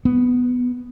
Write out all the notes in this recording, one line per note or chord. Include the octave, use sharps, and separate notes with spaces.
B3